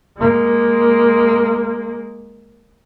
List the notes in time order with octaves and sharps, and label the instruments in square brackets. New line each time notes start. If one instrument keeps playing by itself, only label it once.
[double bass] G#3 A#3